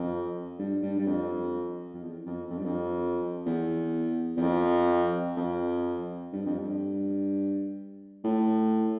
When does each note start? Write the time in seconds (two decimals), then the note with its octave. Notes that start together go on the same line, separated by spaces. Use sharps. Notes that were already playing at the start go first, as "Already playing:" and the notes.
Already playing: F2
0.59 G2
0.82 G2
0.99 G2
1.07 F2
1.94 F2
2.02 E2
2.26 F2
2.50 F2
2.58 G2
2.65 F2
3.46 E2
4.36 E2
4.41 F2
5.37 F2
6.32 G2
6.46 F2
6.59 G2
8.24 A2